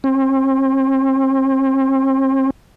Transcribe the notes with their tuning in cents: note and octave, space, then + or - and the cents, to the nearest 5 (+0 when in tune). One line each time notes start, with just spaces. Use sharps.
C4 +40